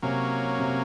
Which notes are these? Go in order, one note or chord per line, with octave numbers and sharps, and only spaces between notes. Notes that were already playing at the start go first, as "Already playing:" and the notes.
C3 F#3 A#3 C#4
C3